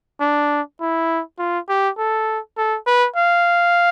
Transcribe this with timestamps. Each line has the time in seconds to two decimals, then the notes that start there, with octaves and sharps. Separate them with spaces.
0.20 D4
0.80 E4
1.39 F4
1.69 G4
1.98 A4
2.57 A4
2.87 B4
3.16 F5